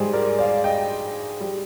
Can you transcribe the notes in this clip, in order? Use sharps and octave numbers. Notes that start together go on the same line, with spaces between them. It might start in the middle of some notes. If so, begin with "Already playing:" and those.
Already playing: G#2 G3 G#4 C5
A#4 D5
D5 F5
D#5 G5
G3